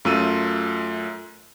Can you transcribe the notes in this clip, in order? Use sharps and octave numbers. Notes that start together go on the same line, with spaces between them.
F#2 A3 F4 E6 D#7